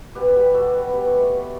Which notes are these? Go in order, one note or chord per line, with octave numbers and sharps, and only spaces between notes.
B2 G4 B4
G3 B3
B2 F#4 A4
G3 B3
B2 G4 B4
A4 C#5
A3
C#5 E5
B2